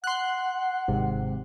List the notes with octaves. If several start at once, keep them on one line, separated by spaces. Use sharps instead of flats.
F#5 C6 F#6
G#1 G#2 C3